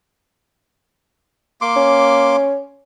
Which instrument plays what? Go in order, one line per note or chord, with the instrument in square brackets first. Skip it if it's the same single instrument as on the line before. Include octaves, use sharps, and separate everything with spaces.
[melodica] A#3 C6 D6
[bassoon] C#4